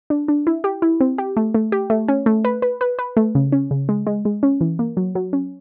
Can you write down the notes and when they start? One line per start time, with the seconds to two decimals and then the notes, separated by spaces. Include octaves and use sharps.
0.10 D4
0.28 D4
0.47 E4
0.64 G4
0.82 E4
1.00 C4
1.18 G4
1.37 A3
1.54 A3
1.72 G4
1.90 A3
2.08 C#4
2.26 A3
2.45 B4
2.62 B4
2.81 B4
2.99 B4
3.17 A3
3.35 C#3
3.52 C#4
3.71 C#3
3.89 G#3
4.07 G#3
4.25 G#3
4.43 C#4
4.61 E3
4.79 A#3
4.97 F#3
5.15 F#3
5.33 C#4